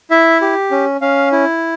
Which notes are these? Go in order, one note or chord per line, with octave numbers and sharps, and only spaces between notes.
E4 E5
G4
C#4
C#4 F5
E4